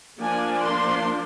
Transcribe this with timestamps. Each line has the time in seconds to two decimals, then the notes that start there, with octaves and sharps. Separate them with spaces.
0.20 F3 A#3 D4 G#5
0.60 C6